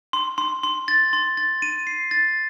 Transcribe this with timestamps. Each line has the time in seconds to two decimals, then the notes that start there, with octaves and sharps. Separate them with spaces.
0.13 C6
0.38 C6
0.63 C6
0.88 A6
1.13 C6
1.37 A6
1.62 D#7
1.87 C7
2.11 A6